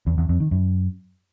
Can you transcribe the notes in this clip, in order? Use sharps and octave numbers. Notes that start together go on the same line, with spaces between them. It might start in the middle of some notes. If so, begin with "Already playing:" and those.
E2
E2
F2
D#3
F#2